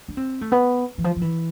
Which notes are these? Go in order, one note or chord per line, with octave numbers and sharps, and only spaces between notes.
D4
C4
A3
B3
E3
F3
F3
E3